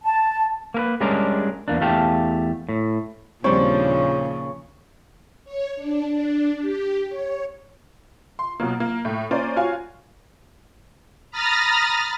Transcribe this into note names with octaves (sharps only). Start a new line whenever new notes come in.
A5
A#3 A#4 B4
G3 G#3 C#4 D4 G#4 A#4
E2 A#3 D4
E2 A3 G4 F5 A5
A2
D#2 A#2 C#3 F3 G3 C4 D4 C#5
C#5
D4
D4
G4
C#5
C6
B2 F#3 A#3
A#3
A2
A#3 C#4 C5 D5
F4 F#4 C#5 F5 G#5
A#5 B5 D#6 F6 A6 A#6